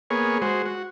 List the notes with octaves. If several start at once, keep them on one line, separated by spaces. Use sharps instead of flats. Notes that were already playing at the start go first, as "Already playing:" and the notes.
A#3 B3 G#4 C#5
G#3 F#4 C5
F#4